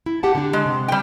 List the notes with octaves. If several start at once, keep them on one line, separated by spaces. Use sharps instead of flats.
E4
G4 F#5 A5
D3 D4
G#3
C3
G3 G5